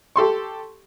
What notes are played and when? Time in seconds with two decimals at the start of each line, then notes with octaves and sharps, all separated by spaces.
0.16 G4 A4 C6 C#6